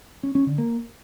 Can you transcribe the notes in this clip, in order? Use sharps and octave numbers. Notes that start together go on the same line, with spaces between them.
C#4
C#4
D3
A#3